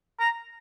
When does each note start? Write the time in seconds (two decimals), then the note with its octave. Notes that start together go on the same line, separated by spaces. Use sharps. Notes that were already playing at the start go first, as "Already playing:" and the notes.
0.20 A#5